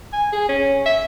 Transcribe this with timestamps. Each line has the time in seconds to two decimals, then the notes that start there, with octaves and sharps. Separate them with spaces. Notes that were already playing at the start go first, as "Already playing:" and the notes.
0.13 G#5
0.32 G#4
0.49 C#4
0.86 E5